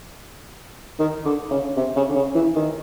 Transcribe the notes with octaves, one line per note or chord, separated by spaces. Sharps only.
D#3
D3
C#3
C3
C#3
D3
C#3
E3
D#3